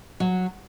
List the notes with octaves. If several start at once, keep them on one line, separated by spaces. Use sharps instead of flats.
F#3